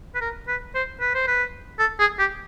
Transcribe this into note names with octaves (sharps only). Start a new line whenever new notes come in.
B4
A#4
B4
C5
B4
C5
B4
A4
G#4
G4